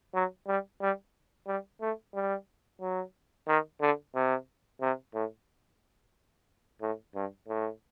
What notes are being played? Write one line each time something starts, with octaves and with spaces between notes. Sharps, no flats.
F#3
G3
G3
G3
A3
G3
F#3
D#3
D3
C3
C3
A2
A2
G2
A2